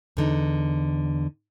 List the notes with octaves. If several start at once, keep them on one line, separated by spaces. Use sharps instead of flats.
E2 D3 D#4